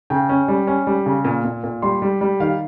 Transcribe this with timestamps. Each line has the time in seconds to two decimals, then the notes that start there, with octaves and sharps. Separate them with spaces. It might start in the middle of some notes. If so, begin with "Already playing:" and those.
0.10 C#3 G5
0.29 C#4
0.48 G3
0.67 C#4
0.87 G3
1.06 C#3
1.25 A#2
1.44 A#2
1.64 A#2
1.82 G3 C6
2.02 G3
2.21 G3
2.40 D#3 F5